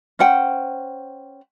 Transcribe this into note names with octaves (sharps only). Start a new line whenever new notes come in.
C#4 C5 F#5 G5